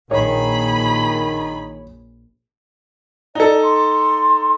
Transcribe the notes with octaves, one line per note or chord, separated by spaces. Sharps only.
A#1 D#3 G#4 C#5 B5
D#4 A4 D5
C6